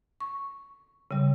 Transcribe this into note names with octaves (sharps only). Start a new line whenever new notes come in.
C#6
C#3 G3